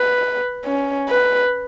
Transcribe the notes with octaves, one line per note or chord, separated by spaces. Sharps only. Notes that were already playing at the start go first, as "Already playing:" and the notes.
Already playing: B4
C#4
B4